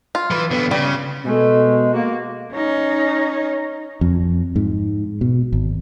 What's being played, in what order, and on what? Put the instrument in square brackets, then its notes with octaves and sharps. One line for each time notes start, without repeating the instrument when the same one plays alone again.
[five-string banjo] F4
[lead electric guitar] E3 B4
D3 B3
[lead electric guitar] C#3 [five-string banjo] G3
[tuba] B2 [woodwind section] G#3 [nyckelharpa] A3
[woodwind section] A#3 [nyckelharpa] F#4
[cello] C#4 D#4
[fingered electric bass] F2
G#2
B2
G#1